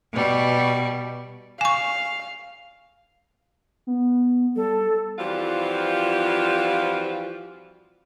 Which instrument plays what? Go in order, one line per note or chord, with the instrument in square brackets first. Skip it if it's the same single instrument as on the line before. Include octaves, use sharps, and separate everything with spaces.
[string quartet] B2 G3
[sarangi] F5 [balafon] G#5 C#6
[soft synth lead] B3
[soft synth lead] G3 [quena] A4
[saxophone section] E3 F3 G3 C4 F4 F#4